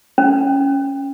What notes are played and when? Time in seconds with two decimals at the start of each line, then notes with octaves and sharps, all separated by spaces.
0.18 C#4